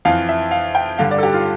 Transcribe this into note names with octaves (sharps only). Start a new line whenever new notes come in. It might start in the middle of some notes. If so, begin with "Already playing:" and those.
F2 E3 F5
E5
F5
G5
G2 D3 F5
D5
A4
G4
F4